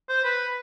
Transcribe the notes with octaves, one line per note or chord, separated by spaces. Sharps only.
C5
B4